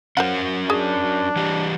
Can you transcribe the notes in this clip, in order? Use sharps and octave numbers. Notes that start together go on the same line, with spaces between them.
F#3 C#4 A#4 C5 F5 F#5
D4 G#4
E3 G3 G4